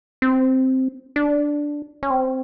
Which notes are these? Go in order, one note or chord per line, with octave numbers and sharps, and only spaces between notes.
C4
D4
C#4
C4